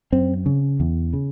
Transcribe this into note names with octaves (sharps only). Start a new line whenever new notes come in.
F#2 C4
C#3
E2
C#3